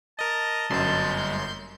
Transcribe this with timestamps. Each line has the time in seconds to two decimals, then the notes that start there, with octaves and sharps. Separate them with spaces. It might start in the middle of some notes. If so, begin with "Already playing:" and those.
0.19 A#4 D#5 A5
0.71 G1 F#2 G3 D#5 C6 G6